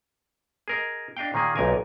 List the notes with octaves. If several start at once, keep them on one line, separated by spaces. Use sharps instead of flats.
G#4 A#4 D#5
D4 D#5 F5 G5
A#2 D#3 A#3 G#4
B1 A#2 A#4 G#5